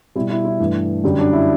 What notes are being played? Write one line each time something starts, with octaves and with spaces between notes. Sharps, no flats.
B2 G3 E4
E4
E4
G2 E3 A3
F#2 D3 G3
D4
E4